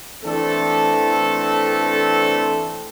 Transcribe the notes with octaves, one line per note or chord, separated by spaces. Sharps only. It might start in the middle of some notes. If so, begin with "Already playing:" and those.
E3 A3 C4 D4 A4